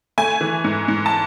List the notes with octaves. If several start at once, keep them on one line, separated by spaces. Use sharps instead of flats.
A3 G#5
E3
G#2
G#2
A5